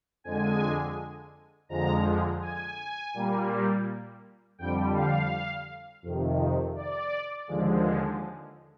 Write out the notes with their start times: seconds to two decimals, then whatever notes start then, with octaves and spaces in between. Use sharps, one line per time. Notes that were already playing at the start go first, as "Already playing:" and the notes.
0.24 F2 D3 G#3 G#5
1.69 F2 D3 F3 G#3 A#5
2.41 G#5
3.14 A#2 G3 A#3
4.58 F2 D3 G3 G5
4.94 F5
6.03 F2 C3 D#3
6.75 D5
7.48 D#2 D3 F3 G#3